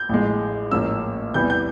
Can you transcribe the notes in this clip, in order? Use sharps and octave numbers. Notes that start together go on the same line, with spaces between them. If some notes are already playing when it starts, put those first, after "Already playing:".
Already playing: G6
A1 A2 F3 G#3
A1 G#2 F3 A#3 C#4 E6
E2 C3 E3 G3 B3 G6
G6